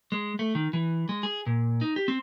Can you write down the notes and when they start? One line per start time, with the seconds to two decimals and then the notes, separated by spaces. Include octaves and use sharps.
0.12 G#3
0.39 A3
0.55 D#3
0.73 E3
1.09 G#3
1.23 G#4
1.46 A#2
1.81 D#4
1.96 G4
2.08 C4